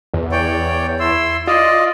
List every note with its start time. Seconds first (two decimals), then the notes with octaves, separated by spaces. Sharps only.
0.14 E2
0.32 C#5 D5 G5
1.00 E4 C6 E6
1.47 F4 D5 D#5